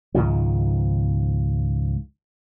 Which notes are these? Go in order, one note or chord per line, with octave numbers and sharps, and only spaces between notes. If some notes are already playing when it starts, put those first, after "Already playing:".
C#2 G#2 D#3 F3